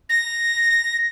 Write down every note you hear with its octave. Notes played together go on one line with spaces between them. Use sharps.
A#6